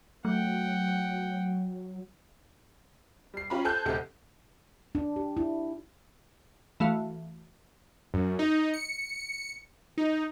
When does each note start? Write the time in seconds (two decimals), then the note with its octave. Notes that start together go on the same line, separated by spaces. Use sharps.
0.25 F#3 A3 F#5 G5
3.34 G3 C7
3.50 C#4 F4 G4 A#5 B5
3.65 A4 C5 G#5 A5 F#6 G6
3.85 F1 D2 C3 A4
4.95 D4
5.16 G4
5.37 E4
6.80 E3 A3 F#4 F5
8.14 F#2
8.39 D#4
8.74 C#7
9.98 D#4